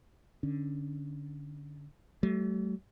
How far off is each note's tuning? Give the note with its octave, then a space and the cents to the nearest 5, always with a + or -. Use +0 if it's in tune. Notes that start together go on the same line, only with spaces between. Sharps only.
D3 +0 C#4 +0
F#3 +45 A3 -20